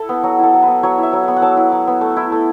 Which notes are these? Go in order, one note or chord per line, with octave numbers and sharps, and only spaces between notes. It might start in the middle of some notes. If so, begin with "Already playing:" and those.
Already playing: E4 A4
B3
F#3 F#4
E4 A4
F#3
B4
B3
F#3 C#5
E4
E5
F#3
B3 F#5
F#5
F#3 A5
E4
F#3
B3
A3
E4
A3